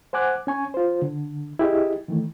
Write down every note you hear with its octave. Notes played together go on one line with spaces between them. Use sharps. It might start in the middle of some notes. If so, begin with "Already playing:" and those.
C5 F#5 G#5 D6 F#6
C#4 G#5 C#6
F4 C5
D3
E4 G4 G#4 D#5
D#3 E3 A3